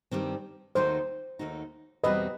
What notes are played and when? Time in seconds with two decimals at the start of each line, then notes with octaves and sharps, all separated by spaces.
0.11 G2 D#3 G3 C4
0.75 D#2 D#3 A3 D#4 F#4 C5
1.39 D#2 D#3 A3 D#4 F#4
2.04 E2 B2 G3 C4 F#4 B4 D#5